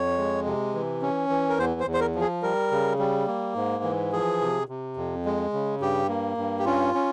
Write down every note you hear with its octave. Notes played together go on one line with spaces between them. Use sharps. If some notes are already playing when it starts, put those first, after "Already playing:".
Already playing: F2 C#5
G#3
C3
E3
C#4
E3
A#4
E2 C5
C5
E2
C5
A#4
F3
G#4
G3 A#4
C#3
G3
A#3
G#2
E3
F3 G#4
C3
C3
F2
G#3
C#3
G2 G4
A#3
G2
G4
C#4 F4
C#4